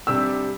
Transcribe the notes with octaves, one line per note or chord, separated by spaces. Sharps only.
C3 G3 D4 G4 E6